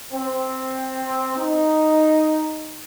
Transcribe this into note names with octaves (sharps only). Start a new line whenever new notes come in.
C4
D#4